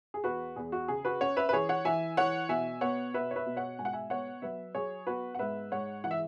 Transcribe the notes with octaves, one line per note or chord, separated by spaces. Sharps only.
G#4
E2 F#4 B4
E2 G#4
F#4
C#3 G#4
F#4 B4
C#4 C#5 F#5
B4 E5
B4
E3 G#4 C#5
C#5 F#5
E3 E5 G#5
E3 C#5 F#5
B2 E5 G#5
B3 C#5 F#5
B2 B4 E5
C#5
B4 E5
B2
C#5 F#5
G#2 G#5
F#5
E5 G#5
B3 C#5 F#5
F#3 B4 E5
F#3 G#4 C#5
B3 F#4 B4
F#5
G#2 B4 E5
G#2 C#5 F#5
E3 F#5
E5